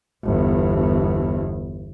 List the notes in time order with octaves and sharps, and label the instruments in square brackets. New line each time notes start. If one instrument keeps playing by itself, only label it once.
[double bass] G1 E2